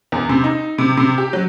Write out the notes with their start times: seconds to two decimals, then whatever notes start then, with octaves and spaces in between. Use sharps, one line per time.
0.12 E2
0.29 C3
0.44 D#4
0.78 C3
0.97 C3
1.18 G4
1.33 F#3